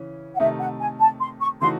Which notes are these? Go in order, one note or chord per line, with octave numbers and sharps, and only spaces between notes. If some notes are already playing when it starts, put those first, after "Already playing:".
Already playing: C#3 E3 C#4
F#5
C3 D#3 A3 D#4 E5
F#5
G#5
A5
C6
C#6
C#3 E3 A3 D#4 F#4 C6